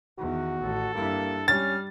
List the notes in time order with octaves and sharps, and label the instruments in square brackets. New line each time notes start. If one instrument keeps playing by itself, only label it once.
[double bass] E2 D#3 [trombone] F#4
[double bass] A1 [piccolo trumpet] A4
[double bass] G2 E4 [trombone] A#3
[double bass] G3 [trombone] C#4 [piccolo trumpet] F6 [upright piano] A6